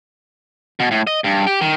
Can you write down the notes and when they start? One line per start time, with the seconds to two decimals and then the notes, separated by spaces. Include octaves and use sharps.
0.80 B2
0.91 A2
1.07 D#5
1.24 G2
1.47 G4
1.61 D#3